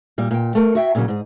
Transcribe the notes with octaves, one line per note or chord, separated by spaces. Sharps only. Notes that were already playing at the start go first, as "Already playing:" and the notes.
A#2 G3
A#2 G5
A3 A#4
F#4 E5 G5
A#2 C#3 F#3
G#2 G#4